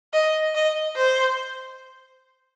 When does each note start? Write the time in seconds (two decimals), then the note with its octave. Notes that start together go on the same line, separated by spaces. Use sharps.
0.13 D#5
0.55 D#5
0.96 C5